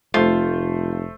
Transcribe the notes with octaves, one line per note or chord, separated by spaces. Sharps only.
F1 A3 F4 C5